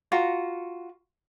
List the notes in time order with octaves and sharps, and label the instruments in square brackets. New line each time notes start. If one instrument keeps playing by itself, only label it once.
[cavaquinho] F4 F#4 A#5